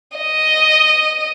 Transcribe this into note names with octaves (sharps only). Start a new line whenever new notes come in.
D#5